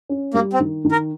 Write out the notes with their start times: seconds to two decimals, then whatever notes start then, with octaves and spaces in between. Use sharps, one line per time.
0.09 C#4
0.34 G3 A#3
0.53 C4
0.60 D#3
0.85 D#3
0.91 A#4